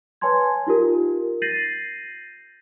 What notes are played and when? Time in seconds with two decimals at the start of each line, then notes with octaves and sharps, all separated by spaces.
0.21 B4 C#5 G#5 A5 C6 G#6
0.67 D#4 F4 G4 A#4
1.42 G6 A6 A#6 C7 D#7 F#7